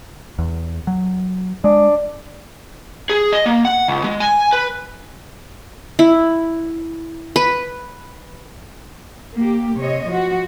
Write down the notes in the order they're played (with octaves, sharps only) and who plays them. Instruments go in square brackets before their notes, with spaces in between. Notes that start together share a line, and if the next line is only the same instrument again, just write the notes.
[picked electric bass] E2
F#3
[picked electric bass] G#3 [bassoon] D4
[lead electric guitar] G#4
D#5
A#3
F#5
C#2
G#3
G#5
B4
[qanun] E4
B4
[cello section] A#3 G4
C3 C#5 D#5
F3 F#4